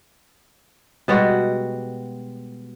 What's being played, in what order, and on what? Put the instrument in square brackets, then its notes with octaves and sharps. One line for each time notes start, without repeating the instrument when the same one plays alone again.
[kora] B2 G3 G#3 F#4